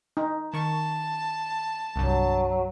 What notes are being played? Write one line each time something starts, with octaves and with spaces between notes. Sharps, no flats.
D#4
D#3 A5 C#6
C2 G2 F#3